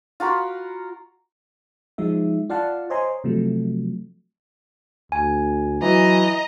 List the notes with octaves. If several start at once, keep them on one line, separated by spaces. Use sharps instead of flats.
F4 F#4 A#4 B5
F3 G#3 D#4 E5
F4 D5 F5 F#5 A5
C5 C#5 D#5 G#5 A#5 C6
C3 F3 F#3 A3
D2 G#5
E3 F#3 D#5 A#5